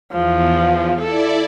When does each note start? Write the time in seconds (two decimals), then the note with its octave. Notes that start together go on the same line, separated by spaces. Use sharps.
0.12 E2 F3
1.01 E4 A4 D5